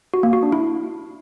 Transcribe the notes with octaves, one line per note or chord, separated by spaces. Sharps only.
F#4
A#3
F#4
D4
E4